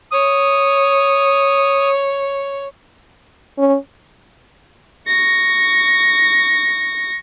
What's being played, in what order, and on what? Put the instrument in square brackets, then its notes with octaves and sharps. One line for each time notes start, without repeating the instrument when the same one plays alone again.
[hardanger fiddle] C#5 [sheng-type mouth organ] D#6
[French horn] C#4
[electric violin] C#6 A#6